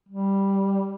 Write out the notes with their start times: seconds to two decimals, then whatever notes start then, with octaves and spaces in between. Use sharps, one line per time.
0.09 G3